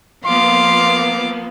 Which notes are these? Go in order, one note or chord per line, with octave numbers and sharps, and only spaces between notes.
F3 A#3 B3 F5 C6 D6